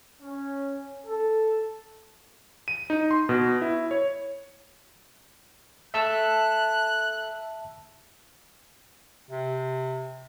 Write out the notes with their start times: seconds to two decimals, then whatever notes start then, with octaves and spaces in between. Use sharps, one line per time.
0.22 C#4
1.06 A4
2.68 D#7
2.90 D#4
3.11 C6
3.29 B2
3.62 E4
3.91 C#5
5.94 A4 E5 A5 E6 F#6
9.29 C3